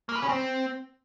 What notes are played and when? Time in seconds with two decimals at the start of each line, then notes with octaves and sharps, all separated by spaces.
0.09 A#3
0.15 B4
0.22 C#4
0.29 C4